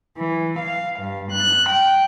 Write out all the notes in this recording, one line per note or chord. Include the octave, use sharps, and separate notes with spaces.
E3
F5
G2
F#6
G5